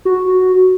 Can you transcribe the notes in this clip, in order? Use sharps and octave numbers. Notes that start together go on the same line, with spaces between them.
F#4